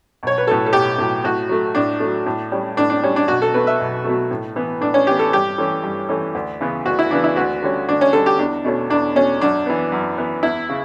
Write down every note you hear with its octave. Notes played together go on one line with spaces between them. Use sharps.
B1 C#5
B4
A2 F#3 A4
A4
B1 G4
A2 F#3
A2 F#4
F#3 A3
A2 D4
F#3 A3
A2
G3 C#4
A2 D4
D4
G3 C#4
D4
B1 F#4
A4
B2 F#3 A3 B4
E5
B1
B2 F#3 A3
A2
E3 B3
A2 D4
C#4
E3 B3 G4
A4
G2 G4
E3 A3 C#4
G2
E3 A3 C#4
D2
C#3 E3 B3
D2 F#4
E4
C#3 E3 B3 D4
E4
D2 F#4
D3 G3 C#4
D2 D4
C#4
D3 G3 C#4 A4
G4
E2 D4
B2 A3 C#4
E2 D4
B2 A3 C#4
F#2 D4
E3 B3
F#2
E3 B3
E2 E4
C#3